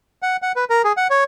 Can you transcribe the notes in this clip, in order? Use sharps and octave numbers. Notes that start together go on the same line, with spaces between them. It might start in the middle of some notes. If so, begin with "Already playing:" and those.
F#5
F#5
B4
A#4
G#4
F#5
C#5